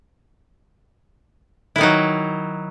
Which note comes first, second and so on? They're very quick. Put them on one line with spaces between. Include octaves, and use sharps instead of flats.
E4 D#3 D#4 F#3